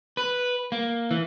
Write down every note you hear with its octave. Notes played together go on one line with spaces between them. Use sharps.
B4
A#3
E3